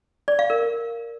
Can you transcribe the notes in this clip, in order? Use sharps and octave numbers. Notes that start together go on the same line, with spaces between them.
D5
F5
A#4